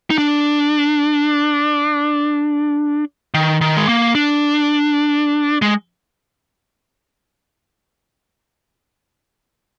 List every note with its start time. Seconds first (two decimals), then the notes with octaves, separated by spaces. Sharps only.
0.10 D#4
0.18 D4
3.34 D#3
3.61 D#3
3.77 G#3
3.88 A#3
4.15 D4
5.62 G#3